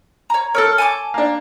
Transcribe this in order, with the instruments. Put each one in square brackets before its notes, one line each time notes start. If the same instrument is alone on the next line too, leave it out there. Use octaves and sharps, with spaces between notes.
[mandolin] C#5 A#5
[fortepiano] A4 C#5 [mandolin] A#4 E6 F#6
[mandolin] G#5 A5 D6
[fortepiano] A#3 D4